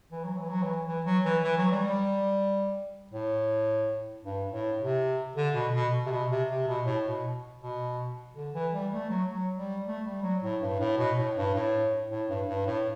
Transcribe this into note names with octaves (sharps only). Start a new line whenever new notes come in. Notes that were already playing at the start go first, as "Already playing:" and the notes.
E3
F#3
E3
F#3
E3
E3
F#3
E3
E3
F#3
G3
G3
A2
G2
A2
C3
D3
B2
B2
C3
B2
C3
C3
B2
A2
B2
B2
D3
E3
G3
A3
F#3
F#3
G3
A3
G3
F#3
A2
G2
A2
B2
A2
G2
A2
A2
G2
G2
A2